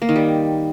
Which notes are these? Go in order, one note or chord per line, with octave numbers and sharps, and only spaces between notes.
A#3
D#3
G3